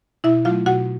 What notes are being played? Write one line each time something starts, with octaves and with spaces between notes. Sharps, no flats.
B2 E4 E5
F#3 A3 F4 F5
B2 F#4 F#5